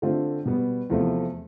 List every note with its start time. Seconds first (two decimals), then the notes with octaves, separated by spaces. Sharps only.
0.02 D3 A3 C4 F4
0.46 B2 G3 B3
0.90 E2 C3 F3 A3